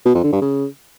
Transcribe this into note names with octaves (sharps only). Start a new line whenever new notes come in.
B2
F2
D3
G2
C#3